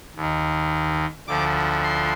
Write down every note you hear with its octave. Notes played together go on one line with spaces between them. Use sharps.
D#2
D#3
D2 D3 F3 D6
C6